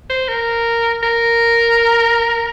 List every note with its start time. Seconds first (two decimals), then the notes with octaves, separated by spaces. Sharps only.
0.10 C5
0.29 A#4
1.03 A#4